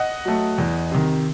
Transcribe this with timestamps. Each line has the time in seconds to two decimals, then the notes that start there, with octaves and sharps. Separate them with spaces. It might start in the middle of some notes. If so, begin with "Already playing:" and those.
Already playing: D#5 F#5
0.25 F#3 A3
0.58 E2
0.91 C3 D#3